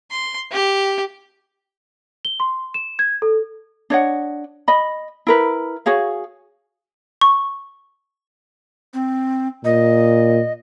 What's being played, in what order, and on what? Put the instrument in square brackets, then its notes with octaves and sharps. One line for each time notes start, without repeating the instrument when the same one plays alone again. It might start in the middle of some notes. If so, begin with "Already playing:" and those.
[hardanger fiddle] C6
G4
[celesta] G7
C6
E7
G#6
A4
[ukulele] D4 C#5 D#5 F#5
D#5 B5
E4 A#4 B4
F#4 G#4 C#5 F5
[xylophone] C#6
[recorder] C4
[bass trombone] A#2 [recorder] D#5